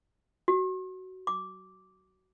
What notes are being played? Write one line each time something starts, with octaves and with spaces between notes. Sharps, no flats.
F#4
D6